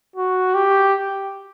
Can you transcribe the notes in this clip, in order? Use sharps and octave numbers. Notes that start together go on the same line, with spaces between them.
F#4
G4